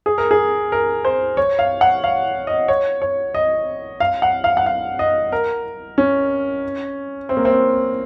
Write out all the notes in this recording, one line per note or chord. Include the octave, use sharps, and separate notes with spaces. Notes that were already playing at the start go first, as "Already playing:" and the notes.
G#4
A#4
G#4
A#4
C5
C#5
F5
F#5
F5
D#5
C#5
C#5
D#5
F5
F#5
F5
F#5
F5
D#5
A#4
C#4
C4
A#3
C4